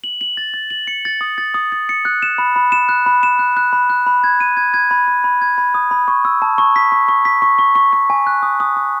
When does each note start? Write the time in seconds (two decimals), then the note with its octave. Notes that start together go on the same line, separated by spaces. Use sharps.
0.04 F#7
0.21 F#7
0.37 A6
0.54 A6
0.70 F#7
0.87 C#7
1.05 A6
1.21 D#6
1.38 A6
1.54 D#6
1.72 A6
1.89 C#7
2.05 F#6
2.22 E7
2.38 B5
2.56 B5
2.72 E7
2.89 F#6
3.06 B5
3.23 E7
3.39 F#6
3.57 F#6
3.73 B5
3.90 F#6
4.07 B5
4.24 G#6
4.40 D#7
4.57 G#6
4.74 G#6
4.91 B5
5.08 B5
5.24 B5
5.42 G#6
5.58 B5
5.74 D#6
5.91 B5
6.08 C#6
6.25 E6
6.42 A5
6.58 C#6
6.76 B6
6.92 C#6
7.08 C#6
7.25 B6
7.42 C#6
7.59 C#6
7.75 C#6
7.93 C#6
8.10 G#5
8.27 F#6
8.43 D#6
8.60 D#6
8.76 D#6